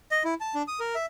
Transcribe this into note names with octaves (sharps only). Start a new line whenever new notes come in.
D#5
E4
A5
D4
D#6
A#4
E5